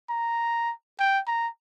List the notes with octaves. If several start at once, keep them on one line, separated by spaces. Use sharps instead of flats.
A#5
G5
A#5